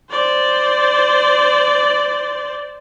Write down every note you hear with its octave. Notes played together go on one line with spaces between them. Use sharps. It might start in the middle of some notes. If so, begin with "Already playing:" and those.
C5 D5